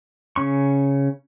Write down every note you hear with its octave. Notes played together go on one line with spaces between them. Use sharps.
C#3 C#4 C#6